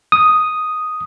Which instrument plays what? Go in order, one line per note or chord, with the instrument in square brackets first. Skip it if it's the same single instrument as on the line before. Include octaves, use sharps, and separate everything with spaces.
[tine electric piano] D#6